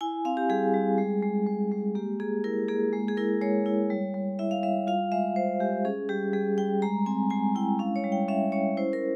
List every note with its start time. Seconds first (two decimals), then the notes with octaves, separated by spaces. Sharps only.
0.01 E4 G#5
0.25 C4 F5
0.37 G4
0.49 G3 G#4
0.74 G3
0.98 G#3
1.23 G#3
1.46 G#3
1.71 G#3
1.95 A#3 G4
2.20 A#3 G#4
2.44 E4 A#4
2.68 A#3 G#4
2.93 G#3
3.08 G#4
3.17 E4 A#4
3.42 G#3 C#5
3.66 E4
3.90 G3
4.14 G3
4.39 E4 E5
4.51 F5
4.63 G3 E5
4.87 F4 F5
5.12 G#3 E5
5.36 G#3 C5
5.60 G#3 G4
5.85 C#4 G#4
6.09 G3 G4
6.33 G3 G#4
6.58 G3 G5
6.82 G#3 A#5
7.06 C4 G#5
7.30 G#3 G#5
7.55 E4 G5
7.79 C#4 F5
7.96 C#5
8.04 G3
8.12 G5
8.28 C#4 E5
8.52 C#4 C#5
8.77 E4 C5
8.93 A#4